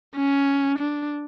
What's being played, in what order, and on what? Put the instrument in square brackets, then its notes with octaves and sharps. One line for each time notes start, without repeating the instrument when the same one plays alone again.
[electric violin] C#4
D4